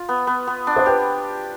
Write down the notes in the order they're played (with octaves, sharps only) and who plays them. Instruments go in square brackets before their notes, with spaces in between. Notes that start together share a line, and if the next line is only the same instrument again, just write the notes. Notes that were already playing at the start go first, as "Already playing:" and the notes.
Already playing: [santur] F4
B3
B3
B3
D4
[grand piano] C5
[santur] G4 [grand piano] B4